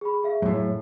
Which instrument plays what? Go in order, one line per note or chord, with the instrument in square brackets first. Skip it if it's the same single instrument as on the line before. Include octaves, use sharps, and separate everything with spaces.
[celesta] G#4 B5
G#4 E5 F5
[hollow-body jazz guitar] F#2 A2